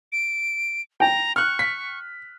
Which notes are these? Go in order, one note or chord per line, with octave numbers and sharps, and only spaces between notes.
D7
G5 A#5
C#6 F6 F#6
B6